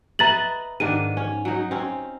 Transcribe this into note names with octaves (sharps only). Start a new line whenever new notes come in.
B4 D#5 E5 A#5 A6 F#7
G#2 D#3 D4 D#7
C#4
F#3 D#4
C4 C#4